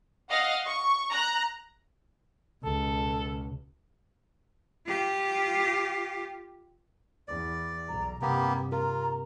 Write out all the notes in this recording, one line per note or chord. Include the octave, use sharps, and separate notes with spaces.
D#5 F5 F#5
C#6
A#5 F#6
C#2 B2 A4
F4 G4
E2 D5
B1 A#5
G2 C3 A#3 B3 G4
F4 A#4 A#5